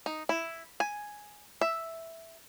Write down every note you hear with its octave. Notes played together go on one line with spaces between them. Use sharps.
D#4
E4
G#5
E5